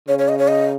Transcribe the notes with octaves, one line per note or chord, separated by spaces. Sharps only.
C#3 C#5
C#5
D#5
C#5
D#5